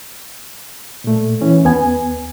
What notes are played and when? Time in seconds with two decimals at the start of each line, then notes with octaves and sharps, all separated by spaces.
1.04 A#2 A3
1.41 E3 C#4
1.64 D#2 B3 G#5